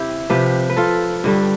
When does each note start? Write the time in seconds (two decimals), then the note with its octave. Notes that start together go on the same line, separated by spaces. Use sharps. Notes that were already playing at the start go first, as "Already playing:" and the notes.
Already playing: C3 E4 G4
0.29 C3 F3 G4 B4
0.69 B4
0.76 F4 A4
1.24 G2 D3 G3